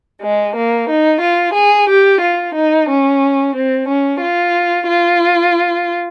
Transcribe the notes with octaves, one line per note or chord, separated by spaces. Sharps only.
G#3
A#3
D#4
F4
G#4
G4
F4
D#4
C#4
C4
C#4
F4
F4